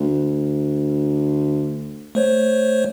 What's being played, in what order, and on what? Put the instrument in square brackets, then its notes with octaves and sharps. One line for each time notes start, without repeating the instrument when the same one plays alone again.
[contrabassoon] D2
[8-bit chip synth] A3 C5 C#5